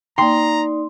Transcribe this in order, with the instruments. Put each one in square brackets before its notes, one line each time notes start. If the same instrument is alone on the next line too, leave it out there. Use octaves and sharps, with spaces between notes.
[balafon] A#3 G5 [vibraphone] D#4 D5 [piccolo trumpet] A#5 [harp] C6